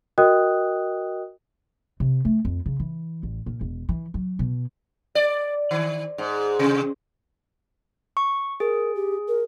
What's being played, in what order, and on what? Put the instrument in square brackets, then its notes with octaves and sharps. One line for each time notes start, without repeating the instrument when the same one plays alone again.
[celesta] F#4 A#4 D#5 G5 D#6 F#6
[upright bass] C3
A3
F2
C#3
E3
A1
A#2
E1
E3
F#3
B2
[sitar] D5
D#3
G#2
C3
[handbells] C#6
[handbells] G#4 [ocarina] A#4
[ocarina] G4
A#4